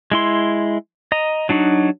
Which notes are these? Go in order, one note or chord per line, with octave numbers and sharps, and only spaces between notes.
G#3 E4 C6
D#5 A#5
F#3 D4 D#4 F#4